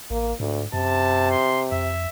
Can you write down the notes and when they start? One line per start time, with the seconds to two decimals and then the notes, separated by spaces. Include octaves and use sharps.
0.10 A1 A#3
0.40 D2 G#2
0.74 F#2 C3 A5
1.31 C6
1.72 F2 E5